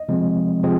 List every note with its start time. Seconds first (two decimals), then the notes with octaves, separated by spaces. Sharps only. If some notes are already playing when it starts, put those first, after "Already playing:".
Already playing: D#5
0.08 C3 F3 G#3 C4
0.63 C3 F3 G#3 C4